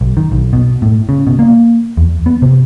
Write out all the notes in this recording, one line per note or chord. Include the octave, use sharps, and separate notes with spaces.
B1
D#3
B1
B2
A2
C#3
B2
A#3
E2
B3
C3